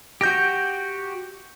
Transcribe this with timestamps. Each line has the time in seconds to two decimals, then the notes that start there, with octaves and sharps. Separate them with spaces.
0.21 F#4 G4 G6 A#6 D7